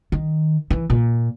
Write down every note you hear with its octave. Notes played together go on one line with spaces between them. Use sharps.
D#3
E3
A#2